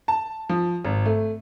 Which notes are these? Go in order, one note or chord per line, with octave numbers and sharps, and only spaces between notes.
A5
F3
G#1
A3